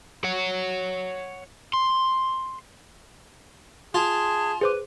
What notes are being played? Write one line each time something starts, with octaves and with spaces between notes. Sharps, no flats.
C#5 F#5
C6
F4 G#4 A5
G#4 B4 C5 D6